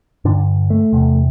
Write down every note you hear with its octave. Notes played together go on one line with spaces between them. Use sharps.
G2 D3 D4
A3
E2 C3